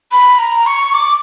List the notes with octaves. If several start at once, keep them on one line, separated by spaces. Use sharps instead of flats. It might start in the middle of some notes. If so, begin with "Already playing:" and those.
B5
A#5
C#6
D6